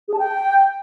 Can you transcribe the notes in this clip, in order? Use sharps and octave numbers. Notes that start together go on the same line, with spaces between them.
G#4
A5
G5